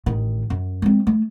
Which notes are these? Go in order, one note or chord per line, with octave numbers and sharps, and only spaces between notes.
A1 D#3
F#2
G#3 C4
A3